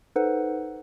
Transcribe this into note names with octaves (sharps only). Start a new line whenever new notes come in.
D#4 A4 B4 C5 F#5